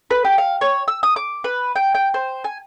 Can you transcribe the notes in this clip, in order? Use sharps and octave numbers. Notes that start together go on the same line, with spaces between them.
B4
G4
F5
C#5
E6
D#6
D6
B4
G5
G5
C5
G#5